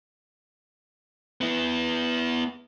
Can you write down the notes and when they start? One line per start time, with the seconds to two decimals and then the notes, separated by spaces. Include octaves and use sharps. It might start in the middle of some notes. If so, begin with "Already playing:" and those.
1.41 B3 E4